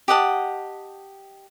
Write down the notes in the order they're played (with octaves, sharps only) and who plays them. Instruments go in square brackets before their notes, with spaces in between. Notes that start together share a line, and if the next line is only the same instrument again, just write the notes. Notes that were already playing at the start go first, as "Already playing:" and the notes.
[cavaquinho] G4 D#5 F#5 A5